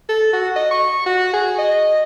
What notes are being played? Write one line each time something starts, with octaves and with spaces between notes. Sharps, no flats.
A4
F#4
D#5
C#6
F#4
G#4
D#5